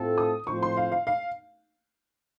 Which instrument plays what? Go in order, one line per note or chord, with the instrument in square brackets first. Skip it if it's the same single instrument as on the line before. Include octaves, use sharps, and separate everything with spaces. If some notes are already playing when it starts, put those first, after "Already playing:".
Already playing: [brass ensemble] A2 A3 C4 F4 A4
[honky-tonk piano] D#6
[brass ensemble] A2 F3 C4 F4 C5 [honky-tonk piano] C#6
[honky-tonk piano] C6
F5
F5
F5